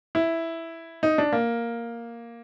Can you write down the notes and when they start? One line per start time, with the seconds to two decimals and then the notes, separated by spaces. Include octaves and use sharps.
0.15 E4
1.03 D#4
1.18 D4
1.33 A#3